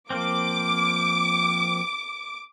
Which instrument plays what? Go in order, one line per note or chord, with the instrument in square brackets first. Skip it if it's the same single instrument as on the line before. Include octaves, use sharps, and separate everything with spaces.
[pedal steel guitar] F3 A#3 C4 [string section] D6